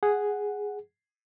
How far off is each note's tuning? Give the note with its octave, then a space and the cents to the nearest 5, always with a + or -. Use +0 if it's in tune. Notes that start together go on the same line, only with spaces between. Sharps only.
G#4 +0 F#5 +0